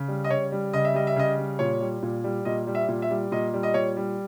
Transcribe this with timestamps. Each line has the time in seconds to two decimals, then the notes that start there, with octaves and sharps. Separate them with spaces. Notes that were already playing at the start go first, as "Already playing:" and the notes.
Already playing: C#3
0.08 G3
0.24 D#5
0.30 C#3 C#5
0.52 G3
0.73 C#3 D#5
0.85 E5
0.94 G3 D#5
1.07 E5
1.16 C#3 D#5
1.38 G3
1.59 A#2 C#5
1.80 G3
2.03 A#2
2.24 G3
2.45 A#2 D#5
2.67 G3
2.75 E5
2.88 A#2
3.02 E5
3.10 G3
3.32 A#2 D#5
3.54 G3
3.63 D#5
3.74 A#2 C#5
3.96 G3